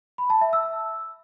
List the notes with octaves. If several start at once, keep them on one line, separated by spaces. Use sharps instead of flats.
B5
A5
E5
E6